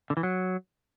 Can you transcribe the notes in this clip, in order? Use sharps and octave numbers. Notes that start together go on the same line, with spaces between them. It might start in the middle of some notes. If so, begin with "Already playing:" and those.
D3
E3
F#3